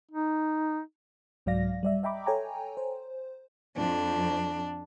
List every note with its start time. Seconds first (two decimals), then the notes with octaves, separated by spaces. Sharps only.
0.12 D#4
1.46 C2 G#2 F#3 D5 F5 A#6
1.83 G3 D5 E5
2.03 D#5 E5 G5 A#5 B5 D6
2.26 A4 C#5 G5 G#5 A#5
2.77 C5
3.76 F2 D4